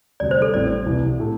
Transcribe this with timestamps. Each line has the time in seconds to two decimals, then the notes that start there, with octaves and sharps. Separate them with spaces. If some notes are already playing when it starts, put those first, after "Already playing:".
0.20 D2 C3 G3 D5
0.31 C5
0.42 A4
0.54 A1 A2 G3 C4 D5
0.86 C2 C3 E3 G3
1.19 A2 A3